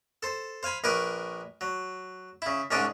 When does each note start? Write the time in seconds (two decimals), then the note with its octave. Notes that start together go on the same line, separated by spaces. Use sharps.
0.23 A4 C5
0.63 C5 F5 G#5 B5
0.84 A#1 A#4 B4 G#5 C#6 D6
1.61 F#3
2.42 C#3 E4
2.71 C2 G#2 C#4 D4 G#4 D6